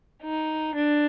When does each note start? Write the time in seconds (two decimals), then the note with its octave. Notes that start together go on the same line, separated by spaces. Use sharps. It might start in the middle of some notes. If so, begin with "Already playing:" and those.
0.22 D#4
0.75 D4